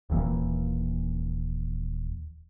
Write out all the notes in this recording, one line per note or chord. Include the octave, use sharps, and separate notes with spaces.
D#1 D#2 E3 A#3